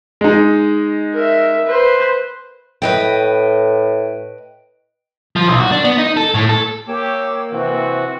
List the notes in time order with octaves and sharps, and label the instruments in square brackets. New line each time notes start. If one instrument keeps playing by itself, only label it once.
[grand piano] G#3 D#4
[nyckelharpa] A#4 E5
B4 C5
[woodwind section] A2 [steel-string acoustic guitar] B4 D#5 G5
[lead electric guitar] F3
B1
F#4
D4
B3
D#4
A4
A2
A4
[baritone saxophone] A#3 [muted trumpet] G4 [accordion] C#5 D6 E6
[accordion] C3 E3 C4 [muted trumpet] F#4